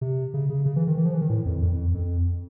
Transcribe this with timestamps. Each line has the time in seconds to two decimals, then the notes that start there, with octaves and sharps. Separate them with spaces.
0.01 C3
0.34 C#3
0.50 C#3
0.65 C#3
0.76 E3
0.87 D#3
0.97 E3
1.06 F3
1.14 E3
1.21 D#3
1.30 A2
1.46 F2
1.62 F2
1.94 F2